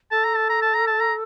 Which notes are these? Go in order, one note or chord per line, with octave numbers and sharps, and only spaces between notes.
A4 A5
A#5
A5
A#5
A5
A#5
A5
A#5